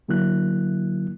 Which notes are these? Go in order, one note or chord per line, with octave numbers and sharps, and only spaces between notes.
C2 D3 F#3 A#3 E4 F#6